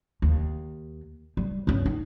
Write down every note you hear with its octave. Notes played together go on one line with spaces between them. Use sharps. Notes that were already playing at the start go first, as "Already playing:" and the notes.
D#2
G3
G2 C#4
D#4